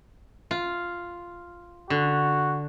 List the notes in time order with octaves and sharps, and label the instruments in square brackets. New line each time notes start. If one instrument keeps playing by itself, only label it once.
[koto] F4
[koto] D3 [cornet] F#4